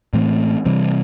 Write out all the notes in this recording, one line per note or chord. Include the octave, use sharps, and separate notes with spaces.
A2 E3 A3 C4
C3 E3 G3 C4